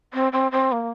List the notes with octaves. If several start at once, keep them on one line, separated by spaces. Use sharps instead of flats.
C4
C4
C4
A#3